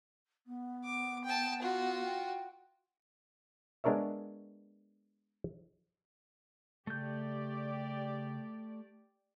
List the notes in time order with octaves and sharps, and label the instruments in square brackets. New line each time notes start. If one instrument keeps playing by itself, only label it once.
[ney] B3
[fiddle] D6
G5 A5
F4 F#4
[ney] G5
[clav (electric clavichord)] G#3 B3 D4 A#4 C#5 E5
[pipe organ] C#3 [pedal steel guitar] A3 G6 [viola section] G4 D5